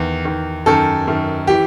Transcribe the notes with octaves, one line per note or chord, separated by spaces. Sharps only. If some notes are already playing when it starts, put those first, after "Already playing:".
Already playing: E2 D#3
E2 D#3
F#2 D#3 A4
F#2 D#3
E3 G4